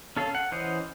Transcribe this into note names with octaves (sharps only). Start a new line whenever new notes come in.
C#4 A4 F5
F#5
E3 C#4 C5 D#5 F#5